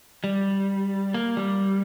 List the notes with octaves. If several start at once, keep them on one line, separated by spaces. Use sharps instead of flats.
G3
A#3
G3